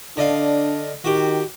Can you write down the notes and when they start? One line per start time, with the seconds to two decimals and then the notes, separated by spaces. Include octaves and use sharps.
0.17 D3 D4 D#5 F5
1.04 D#3 F#4 G4